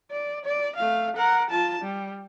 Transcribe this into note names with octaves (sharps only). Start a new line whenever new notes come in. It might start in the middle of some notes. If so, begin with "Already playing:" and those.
D5
D5
A3 F5
A#4 F#5
F4 A5
G3